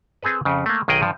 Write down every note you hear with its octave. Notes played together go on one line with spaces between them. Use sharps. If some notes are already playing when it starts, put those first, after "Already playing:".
C4 G#4 A4 B4
F2 C#3
A3 A#3
B1 D#3 G#4 D#5 G5
G2 F3